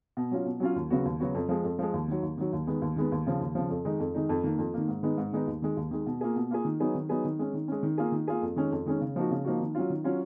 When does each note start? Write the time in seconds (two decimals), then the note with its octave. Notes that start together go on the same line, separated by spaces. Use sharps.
0.17 B2
0.31 F#3 C#4 F4
0.46 B2
0.60 F#3 C#4 F4
0.76 D#2
0.90 C#3 F#3 B3 F#4
1.05 D#2
1.20 C#3 F#3 B3 F#4
1.35 F2
1.49 F3 G#3
1.64 F2
1.79 F3 G#3
1.93 D#2
2.08 D#3 F#3
2.23 D#2
2.38 D#3 F#3
2.53 D#2
2.67 D#3 G#3 B3
2.82 D#2
2.96 D#3 G#3 B3
3.12 D#2
3.27 C#3 F3
3.41 D#2
3.55 C#3 F3
3.70 F2
3.85 D#3 G#3 D#4
4.00 F2
4.14 D#3 G#3 D#4
4.29 F2
4.44 D#3 A#3
4.59 F2
4.74 D#3 A#3
4.88 G#2
5.03 D#3 G#3 B3 D#4
5.18 G#2
5.33 D#3 G#3 B3 D#4
5.47 D#2
5.62 D#3 G#3
5.77 D#2
5.91 D#3 G#3
6.06 B2
6.21 A#3 F4 G#4
6.36 B2
6.51 A#3 F4 G#4
6.65 D#3
6.80 F#3 B3 D#4 G#4
6.95 D#3
7.09 F#3 B3 D#4 G#4
7.25 D#3
7.39 G#3 C#4
7.54 D#3
7.68 G#3 C#4
7.83 D#3
7.98 A#3 F4 G#4
8.12 D#3
8.28 A#3 F4 G#4
8.42 F2
8.56 D#3 G#3 C#4
8.72 F2
8.86 D#3 G#3 C#4
9.01 C#3
9.16 F3 A#3 D#4 F#4
9.31 C#3
9.45 F3 A#3 D#4 F#4
9.60 D#3
9.75 F#3 C#4 F4
9.90 D#3
10.04 F#3 C#4 F4